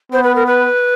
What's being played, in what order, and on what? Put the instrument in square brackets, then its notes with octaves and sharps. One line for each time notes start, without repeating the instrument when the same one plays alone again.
[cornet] B3 [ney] C5
[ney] B4
A#4
B4